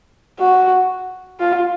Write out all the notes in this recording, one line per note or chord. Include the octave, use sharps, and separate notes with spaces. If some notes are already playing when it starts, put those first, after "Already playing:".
F#4
F4